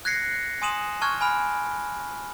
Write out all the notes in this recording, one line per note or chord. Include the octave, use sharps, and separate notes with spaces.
F#6 G#6 A#6 C7 C#7
G#5 C6 D#6 D#7 E7 F#7
A5 C#6 F6 F#6 G#6
G#5 B5 F6 D7